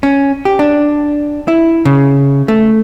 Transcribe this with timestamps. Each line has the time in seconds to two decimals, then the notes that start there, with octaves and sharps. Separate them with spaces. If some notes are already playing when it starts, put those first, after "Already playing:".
0.03 C#4
0.45 G4
0.59 D4
1.48 E4
1.85 C#3
2.48 A3